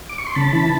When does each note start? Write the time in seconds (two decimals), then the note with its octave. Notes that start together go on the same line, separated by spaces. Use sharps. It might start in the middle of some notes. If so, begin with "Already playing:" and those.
0.09 D6
0.18 C#6
0.27 C6
0.35 C#3 A5 B5
0.53 E3